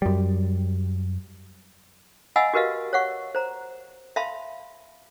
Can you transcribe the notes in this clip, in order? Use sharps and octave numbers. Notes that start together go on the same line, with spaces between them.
F#2 G3
D#5 F5 F#5 G#5 B5 E6
F#4 G4 A#4 B4 D#5 F5
C#5 F5 F#5 C#6
C5 A#5
E5 F5 A5 B5 C6